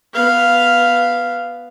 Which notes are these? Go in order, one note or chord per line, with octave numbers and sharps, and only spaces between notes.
B3 F5